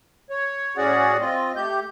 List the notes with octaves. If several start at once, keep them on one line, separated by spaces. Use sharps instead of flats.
C#5
A2 C#4 F#4 G#4 D5 F#5
C4 F4 D#5
A3 G4 G6